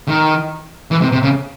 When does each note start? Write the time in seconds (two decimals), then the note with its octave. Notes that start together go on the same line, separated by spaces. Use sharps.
0.08 D#3
0.91 E3
1.02 C3
1.12 C3
1.23 C#3